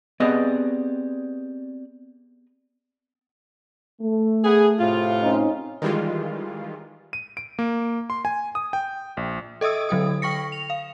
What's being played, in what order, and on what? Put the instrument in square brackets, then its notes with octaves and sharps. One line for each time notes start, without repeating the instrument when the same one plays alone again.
[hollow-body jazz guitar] B3 G#4 D#5 [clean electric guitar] C4 G4 D5
[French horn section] A3
[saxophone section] B3 G#4
A2 C3 F4
[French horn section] C4 C#4 D#4
[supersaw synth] D#3 E3 G3 G#3 F4
[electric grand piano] D#7
D7
A#3
C6
G#5
D#6
G5
A#1
[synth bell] A4 D#5 E5 D#6 E6
D3 F#3 A4 D#6
G5 C#6 A#6 C#7
F7
F5